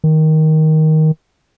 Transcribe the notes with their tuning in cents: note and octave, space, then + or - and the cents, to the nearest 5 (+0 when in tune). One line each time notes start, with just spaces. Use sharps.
D#3 +10